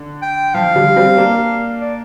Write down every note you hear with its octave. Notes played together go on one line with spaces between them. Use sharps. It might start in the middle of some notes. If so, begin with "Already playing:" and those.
Already playing: D3
G5
F3 F5
D3 G3
G3 C4
A#3 D4
D5